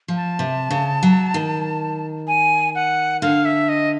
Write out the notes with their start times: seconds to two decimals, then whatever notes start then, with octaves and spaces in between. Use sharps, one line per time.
0.08 F3
0.16 A5
0.39 C3
0.70 C#3
1.03 F#3
1.34 D#3
2.27 G#5
2.75 F#5
3.22 D3 F5
3.45 E5
3.69 D#5